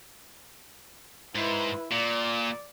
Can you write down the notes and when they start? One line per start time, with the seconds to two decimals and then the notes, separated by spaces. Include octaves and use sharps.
1.35 G#2 E4 B4
1.92 A#2 D5